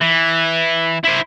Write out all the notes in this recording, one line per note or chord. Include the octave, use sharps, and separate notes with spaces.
E3
E4 C5